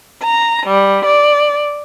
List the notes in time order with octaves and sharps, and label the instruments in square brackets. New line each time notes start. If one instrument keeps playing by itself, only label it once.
[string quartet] A#5
G3
D5